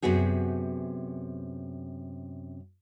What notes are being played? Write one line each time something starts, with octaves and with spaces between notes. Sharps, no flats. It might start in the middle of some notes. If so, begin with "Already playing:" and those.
F#2 C3 B3 F#4 G#4